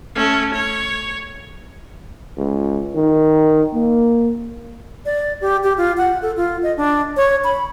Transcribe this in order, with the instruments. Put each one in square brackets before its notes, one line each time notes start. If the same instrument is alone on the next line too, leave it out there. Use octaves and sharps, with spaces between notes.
[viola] A3 C#4
C#5
[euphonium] C#2
D#3
A#3
[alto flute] D5
G4
G4
F4
F#5
A4
F4
D#5
D4
C#5
B5